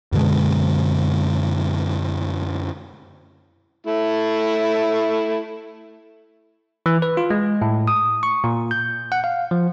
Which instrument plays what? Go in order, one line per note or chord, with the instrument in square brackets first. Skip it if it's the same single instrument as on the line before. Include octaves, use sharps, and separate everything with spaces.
[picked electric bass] F#2 B2 D3 G#3
[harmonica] A3 E4
[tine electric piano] E3
B4
F4
G#3
A2
D#6
C#6
A#2
G6
F#5
F5
F3